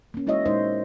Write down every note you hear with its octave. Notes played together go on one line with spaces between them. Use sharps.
A#3 C#4
G#3 E4 F#4 C#5 D#5 E5
A#2 G#3 D#4 A#4 C5 D#5